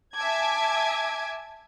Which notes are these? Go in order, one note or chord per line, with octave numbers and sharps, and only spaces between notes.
E5 G#5 A5 D6 G#6